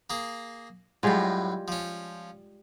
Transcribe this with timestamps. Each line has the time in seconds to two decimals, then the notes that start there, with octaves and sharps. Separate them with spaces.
0.10 A#3 G#4
1.03 F#2 A2 G3 G#3 F4
1.68 F3 C#4